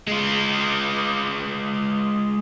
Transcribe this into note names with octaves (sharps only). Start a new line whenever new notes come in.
G#3 F4